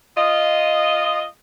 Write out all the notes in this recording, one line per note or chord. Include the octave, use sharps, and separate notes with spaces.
F4 D#5